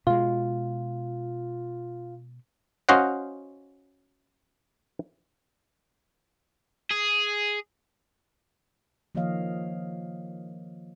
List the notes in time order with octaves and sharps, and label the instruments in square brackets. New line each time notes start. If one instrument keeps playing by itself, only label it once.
[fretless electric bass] B2 G#3 [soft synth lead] F4
[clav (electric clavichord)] C#4 F#4 C5 D#5 F5 F#5
[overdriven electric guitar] G#4
[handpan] D#3 F3 A#3 C#5 D#5 F5